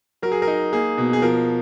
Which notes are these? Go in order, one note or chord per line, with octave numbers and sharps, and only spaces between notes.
F#3 A#4
G#4
A#4
D#4
A#3 G#4
B2
G#4
F3 A#4